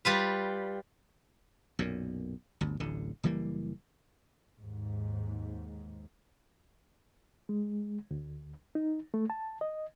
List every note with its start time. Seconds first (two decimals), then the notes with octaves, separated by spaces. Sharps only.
0.05 G3 F4 B4
1.79 B1 F#2 A#2
2.61 G1 D2
2.80 D1 A1 D3
3.23 F#1 E3 G3 A#3
4.58 D#2 G#2
7.49 G#3
8.11 D2
8.75 D#4
9.14 A3
9.30 A5
9.61 D#5